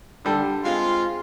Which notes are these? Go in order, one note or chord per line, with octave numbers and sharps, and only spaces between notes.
D3 G3 A4
G#3 C4 F4